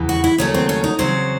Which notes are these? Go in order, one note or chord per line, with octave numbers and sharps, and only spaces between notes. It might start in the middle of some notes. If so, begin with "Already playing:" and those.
Already playing: E2 C#3 E3
F#4
E4
D#2 C#3 F#3 A3 C#4
C4
C#4
D#4
E2 C#3 F#3 C4 C5